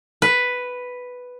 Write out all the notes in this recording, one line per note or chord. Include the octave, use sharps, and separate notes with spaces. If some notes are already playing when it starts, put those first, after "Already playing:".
B4